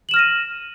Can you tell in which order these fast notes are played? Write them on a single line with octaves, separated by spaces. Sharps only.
F#7 E7 F6 A#6 D#7